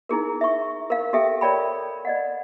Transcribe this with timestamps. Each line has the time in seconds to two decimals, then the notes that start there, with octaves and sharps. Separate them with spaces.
0.09 D#4 E4 G#4 A#4
0.41 E5 C#6
0.90 A#4 F5
1.13 G4 A4 E5 G5
1.41 A#4 C#5 D5 G5 B5
2.05 D5 D#5 F#5